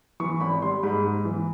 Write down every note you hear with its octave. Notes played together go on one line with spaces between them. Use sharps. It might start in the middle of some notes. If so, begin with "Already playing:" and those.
E3 C#6
G#1 B5
G3 C6
G#2 B5
G#2
E3